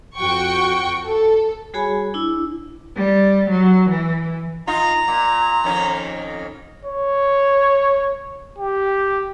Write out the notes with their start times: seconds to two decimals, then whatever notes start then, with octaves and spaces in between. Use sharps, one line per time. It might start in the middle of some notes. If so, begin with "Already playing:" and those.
0.17 F2 F#4 G5 C#6
1.03 A4
1.74 G3 F#4 G#4 C#5 G#5 B5
2.14 D4 E4
2.96 G3
3.50 F#3
3.90 E3
4.67 D#4 F4 A#5
5.08 A#2
5.64 F2 D#3 C#4
6.85 C#5
8.59 G4